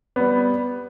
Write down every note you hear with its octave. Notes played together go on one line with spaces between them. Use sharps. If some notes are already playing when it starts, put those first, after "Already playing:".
G3 B3